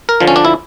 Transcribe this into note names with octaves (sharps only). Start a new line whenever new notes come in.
A#4
D3 F3
C#4
D4
E4